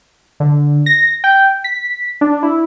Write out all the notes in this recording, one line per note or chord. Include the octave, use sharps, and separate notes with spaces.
D3
A#6
G5
B6
D4
E4